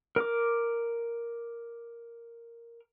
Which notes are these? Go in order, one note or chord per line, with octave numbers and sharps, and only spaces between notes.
A#4 D6